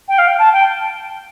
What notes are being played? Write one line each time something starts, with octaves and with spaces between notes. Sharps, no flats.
G5
F5
G5
A5
G5